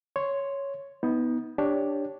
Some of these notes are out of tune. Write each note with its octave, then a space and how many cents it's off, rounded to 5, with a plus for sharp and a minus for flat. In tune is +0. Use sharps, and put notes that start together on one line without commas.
C#5 +0 C6 +0
B3 +0 D#4 +35
D4 +0 G4 +10 C#5 +0